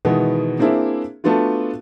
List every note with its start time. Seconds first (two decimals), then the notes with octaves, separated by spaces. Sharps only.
0.05 B2 D#3 E3 G#3 B3
0.59 A#3 C4 D4 E4 G#4
1.24 A3 B3 D4 F4 F#4